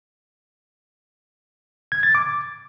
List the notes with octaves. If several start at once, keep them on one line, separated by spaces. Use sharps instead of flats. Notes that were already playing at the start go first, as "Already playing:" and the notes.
G#6
A6
D6